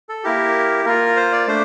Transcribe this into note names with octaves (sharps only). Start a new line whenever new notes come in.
A4
A#3 E4 G4 A#4
A#3 F4 A#4
C5
D5
A3 D4 C5